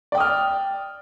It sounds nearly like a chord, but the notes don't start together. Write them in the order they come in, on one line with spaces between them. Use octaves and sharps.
D5 G5 D#6 F6